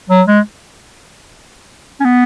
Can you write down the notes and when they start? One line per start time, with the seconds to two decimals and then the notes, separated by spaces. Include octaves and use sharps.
0.10 F#3
0.27 G#3
2.00 C#4
2.05 B3